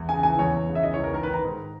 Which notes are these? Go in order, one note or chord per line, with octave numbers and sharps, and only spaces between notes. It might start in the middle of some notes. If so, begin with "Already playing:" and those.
Already playing: E2
C#3 G#5
E3 G#5
E2 C#5
E2
C#3
E5
E3 D#5
C#5
E2 A#4
D#3 A#4
B4
D#3 A#5
G#2